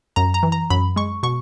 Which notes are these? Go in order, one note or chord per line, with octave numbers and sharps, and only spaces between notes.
F#2 A#5
A#5
E3
A#5
F#2 B5
G#3 C#6
B2 C#6